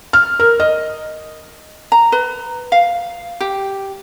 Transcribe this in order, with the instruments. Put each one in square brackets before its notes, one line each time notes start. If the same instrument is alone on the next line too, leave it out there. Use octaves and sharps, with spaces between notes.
[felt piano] F6
A#4
D#5
[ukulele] A#5
B4
F5
G4